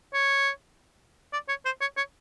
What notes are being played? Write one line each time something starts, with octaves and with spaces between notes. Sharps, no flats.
C#5
D5
C#5
C5
C#5
C#5